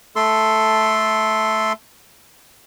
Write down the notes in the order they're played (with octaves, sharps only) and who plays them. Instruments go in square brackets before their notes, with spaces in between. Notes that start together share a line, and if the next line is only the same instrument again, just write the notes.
[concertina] A3 A4 C6